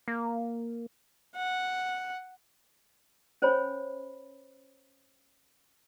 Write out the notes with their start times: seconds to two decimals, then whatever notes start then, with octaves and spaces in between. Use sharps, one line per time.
0.08 A#3
1.36 F#5
3.42 C#4 C5 C#5 G#5 B5